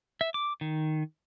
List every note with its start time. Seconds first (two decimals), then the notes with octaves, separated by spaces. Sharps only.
0.21 E5
0.34 D6
0.61 D#3